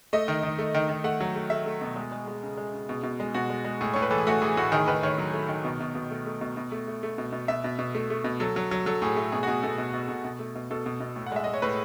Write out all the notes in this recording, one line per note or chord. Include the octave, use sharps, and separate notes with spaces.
A3 D#5
D#3
D#3
A3
D#3
D#3
A3 F#5
F#3
A3
A3 E5
A3
B2
G#3 G#4
G#3
G#3
C#3
G#3
C#3
B2
B2
G#3
B2 F#4
G#3
G#3
A2 G#4
A2 C#5
B4
E3 A4
G#4
A3 F#4
E3 G#4
A2 F#4
D#3 G#4
D#3 B4
D#3 C#5
F#3
A3
D#3
B2
B2
B2
A3
A3
B2
B2
A3
A3
A3
B2
B2
B2 E5
B2
B2
A3
A3
B2
F#3 A4
F#3
F#3
F#3 A4
A2 G#4
A3
B2 G#4
F#4
B2 G#4
B2 A4
B2
B2
B2
B2
A3
B2
B2 A4
B2
B2
A2
F#5
G#3 E5
G#3 D#5
C#5
A2 B4